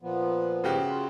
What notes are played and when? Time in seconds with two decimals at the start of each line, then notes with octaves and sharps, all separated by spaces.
0.02 A#2 F3 B3
0.64 C#3 F#4 G4
0.89 F4